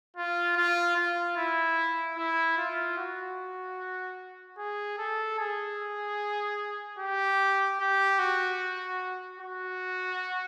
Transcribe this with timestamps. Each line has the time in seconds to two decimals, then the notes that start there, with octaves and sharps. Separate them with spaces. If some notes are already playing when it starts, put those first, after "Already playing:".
0.16 F4
0.57 F4
0.97 F4
1.37 E4
2.17 E4
2.58 F4
2.98 F#4
4.58 G#4
4.98 A4
5.38 G#4
6.99 G4
7.80 G4
8.19 F#4
9.39 F#4